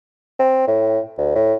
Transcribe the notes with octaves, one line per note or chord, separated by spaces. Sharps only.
C4
A2
D2
A2